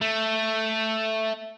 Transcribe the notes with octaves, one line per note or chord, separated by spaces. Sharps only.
A3